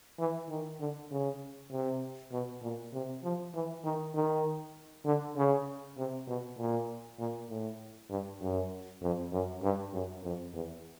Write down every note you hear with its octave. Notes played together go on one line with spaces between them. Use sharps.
E3
D#3
D3
C#3
C3
B2
A#2
C3
F3
E3
D#3
D#3
D3
C#3
C3
B2
A#2
A#2
A2
G2
F#2
F2
F#2
G2
F#2
F2
E2